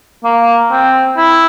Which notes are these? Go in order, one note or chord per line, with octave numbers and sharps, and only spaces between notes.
A#3
C4
E4